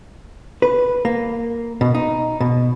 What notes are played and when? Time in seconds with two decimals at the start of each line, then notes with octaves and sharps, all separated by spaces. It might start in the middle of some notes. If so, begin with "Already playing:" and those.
0.62 B4
1.05 A#3
1.81 B2
1.95 D#4
2.41 B2